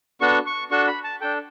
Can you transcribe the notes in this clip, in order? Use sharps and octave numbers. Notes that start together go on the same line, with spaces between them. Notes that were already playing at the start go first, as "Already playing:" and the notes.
B3 D4 F#4 A4 C#6
C#6
D4 F#4 A4 C#6
B5
A5
D4 A4 G5